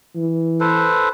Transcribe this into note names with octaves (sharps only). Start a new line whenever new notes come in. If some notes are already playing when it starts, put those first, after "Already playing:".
E3
A4 B4 C5